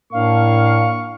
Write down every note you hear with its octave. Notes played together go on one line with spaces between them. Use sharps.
A2 A#3 D4 F5 C#6